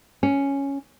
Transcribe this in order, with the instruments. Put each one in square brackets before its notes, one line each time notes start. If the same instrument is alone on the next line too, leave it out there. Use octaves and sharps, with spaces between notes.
[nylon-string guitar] C#4